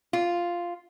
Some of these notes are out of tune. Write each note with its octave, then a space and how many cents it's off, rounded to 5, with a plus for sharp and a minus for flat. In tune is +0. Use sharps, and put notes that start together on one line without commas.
F4 -5